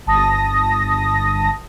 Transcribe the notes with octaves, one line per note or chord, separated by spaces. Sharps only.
G1 A5 D#6 A#6